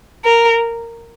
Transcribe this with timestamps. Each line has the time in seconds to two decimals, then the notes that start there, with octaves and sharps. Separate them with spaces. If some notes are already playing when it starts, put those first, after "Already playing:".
0.25 A#4